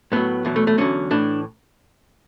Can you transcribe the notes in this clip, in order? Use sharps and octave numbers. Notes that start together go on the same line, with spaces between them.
A2 F#3 B3
E2 B2 F#3
A3
A3
E2 D3 F#3 C#4
A2 E3 D4